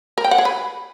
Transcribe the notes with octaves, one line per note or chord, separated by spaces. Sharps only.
A#4
G5
F#5
G#4
B4